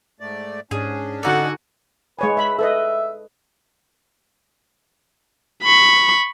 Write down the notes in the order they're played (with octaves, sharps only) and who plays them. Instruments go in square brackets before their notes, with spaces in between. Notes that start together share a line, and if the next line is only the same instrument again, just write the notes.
[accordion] G#2 A3 D5
[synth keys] G#2 [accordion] C#4 D4 [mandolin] G#4
[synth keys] D3 D#4 A4 [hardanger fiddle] F#4 G#5 [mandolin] D5 F#5
[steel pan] G#3 C#5 G#5 [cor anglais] B4
[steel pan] E5 B5
[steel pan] A4 B4 D#5 [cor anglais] E5
[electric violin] B5 C#6